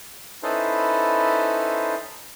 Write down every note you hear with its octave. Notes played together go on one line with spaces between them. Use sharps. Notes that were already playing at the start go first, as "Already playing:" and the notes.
C#4 D#4 E4 A4 B4 C5